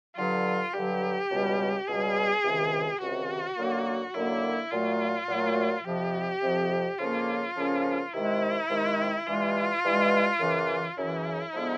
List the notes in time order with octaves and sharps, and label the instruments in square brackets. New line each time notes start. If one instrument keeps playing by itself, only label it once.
[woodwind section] G2 D3 F#3 [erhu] F4
[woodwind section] G2 D3 F#3 [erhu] G4
[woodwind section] C#2 B2 G3
[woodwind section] C#2 B2 G3 [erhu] G#4
[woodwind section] C#2 C3 D#3
[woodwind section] C#2 C3 D#3 [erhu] F#4
[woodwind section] F#2 D3 F#3 A#3
[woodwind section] F#2 D3 F#3 A#3 [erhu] E4
[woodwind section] A#2 F#3 A3 [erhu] F4
[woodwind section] A#2 F#3 A3
[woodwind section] F2 C3 F3 [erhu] G4
[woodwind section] F2 C3 F3
[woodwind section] F2 C#3 F3 A#3 C#4 [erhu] F4
[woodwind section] F2 C#3 F3 A#3 C#4
[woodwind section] C3 D#3 G#3 [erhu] E4
[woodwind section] C3 D#3 G#3
[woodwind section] G2 E3 G#3 [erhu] F4
[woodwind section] G2 E3 G#3
F#2 C#3 E3
[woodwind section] F#2 C#3 E3 [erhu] E4
[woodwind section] D3 F3 G#3 B3